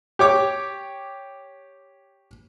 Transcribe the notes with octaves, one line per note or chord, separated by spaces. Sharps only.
G4 C#5 D6